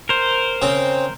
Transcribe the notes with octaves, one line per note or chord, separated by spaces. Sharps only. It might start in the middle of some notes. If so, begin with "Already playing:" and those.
A#4 C5
C#3 C4